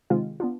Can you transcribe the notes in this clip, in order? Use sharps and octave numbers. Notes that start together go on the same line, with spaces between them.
C3 D#3 G#3 C4 F4
B3 D4 F4